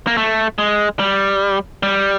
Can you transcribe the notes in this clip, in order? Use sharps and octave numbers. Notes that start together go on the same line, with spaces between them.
A#3
A3
G#3
G3
G3